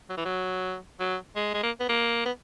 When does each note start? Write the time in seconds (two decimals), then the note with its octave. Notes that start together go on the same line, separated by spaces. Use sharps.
0.10 F#3
0.17 E3
0.25 F#3
1.00 F#3
1.36 G#3
1.54 G#3
1.63 A#3
1.80 B3
1.89 A#3
2.25 B3